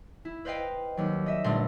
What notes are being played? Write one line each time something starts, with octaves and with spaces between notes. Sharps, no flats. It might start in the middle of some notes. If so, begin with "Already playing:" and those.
E4
B4 C5 D#5 F5 G5
D#2 F#3
D#5 E5
G1 A#2 A3 F5 C6 A#6